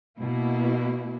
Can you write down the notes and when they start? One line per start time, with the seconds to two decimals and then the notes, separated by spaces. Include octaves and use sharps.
0.19 B2 A#3 E4